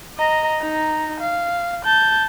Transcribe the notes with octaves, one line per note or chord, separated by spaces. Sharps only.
D#5 A#5
D#4 A#5
F5
A5 G6